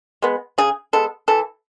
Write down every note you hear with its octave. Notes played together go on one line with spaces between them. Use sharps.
G#3 B3
C#3 G#4
G#3 B3 A4
E3 A4